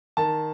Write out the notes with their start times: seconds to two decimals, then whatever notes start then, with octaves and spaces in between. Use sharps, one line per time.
0.17 D#3 A5